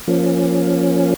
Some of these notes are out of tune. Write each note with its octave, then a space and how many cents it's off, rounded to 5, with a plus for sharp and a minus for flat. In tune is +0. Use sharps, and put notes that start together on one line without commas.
F3 +0 A#3 +0 C#4 +0